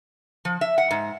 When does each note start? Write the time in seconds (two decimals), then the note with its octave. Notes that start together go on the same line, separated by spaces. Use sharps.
0.45 F3
0.61 E5
0.78 F#5
0.91 G#2